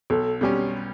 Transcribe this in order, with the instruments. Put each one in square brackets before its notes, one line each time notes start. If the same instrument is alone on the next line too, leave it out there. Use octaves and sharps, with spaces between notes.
[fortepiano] B1 [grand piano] A4
[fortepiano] B2 G3 C#4 [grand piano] G4